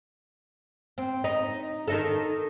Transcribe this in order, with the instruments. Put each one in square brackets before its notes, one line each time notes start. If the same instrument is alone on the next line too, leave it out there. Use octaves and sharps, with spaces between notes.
[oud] C4
D#4
D#3 D#4 A4